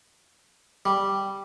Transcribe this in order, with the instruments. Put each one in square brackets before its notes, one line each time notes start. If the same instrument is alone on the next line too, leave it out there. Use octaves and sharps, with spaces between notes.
[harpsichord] G3